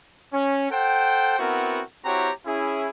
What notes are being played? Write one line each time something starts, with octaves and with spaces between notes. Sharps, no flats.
C#4
A4 C5 F#5 G5
B3 C4 E4 F#4 A#4
C4 E4 F#4 G4 C#5 A#5
C#4 E4 G#4